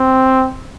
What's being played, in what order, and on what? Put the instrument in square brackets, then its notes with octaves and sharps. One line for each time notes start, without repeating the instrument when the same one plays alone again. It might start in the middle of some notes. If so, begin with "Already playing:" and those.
Already playing: [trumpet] C4